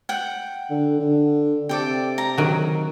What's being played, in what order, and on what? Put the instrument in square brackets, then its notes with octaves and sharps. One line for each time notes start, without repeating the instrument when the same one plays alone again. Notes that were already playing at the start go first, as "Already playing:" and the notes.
[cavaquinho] F#5 G5
[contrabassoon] D3
D3
[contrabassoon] C3 [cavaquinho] A4 D5 G5
[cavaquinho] A#5
[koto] D#3 F#3